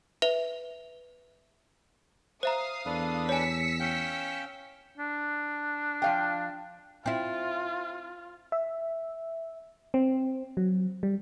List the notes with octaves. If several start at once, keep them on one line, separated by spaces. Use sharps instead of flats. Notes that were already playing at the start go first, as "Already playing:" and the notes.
B4 E5 F7
C5 E5 F5 A#5 D#6
E2 D4 A4 B4
C#5 G#5 E6 B6 C#7
C#4 F5 G5
D4
F3 F5 G5
C4 E4 F4
E5
C4
F#3
G3